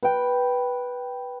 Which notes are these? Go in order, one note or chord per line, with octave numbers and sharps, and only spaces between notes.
B4 G5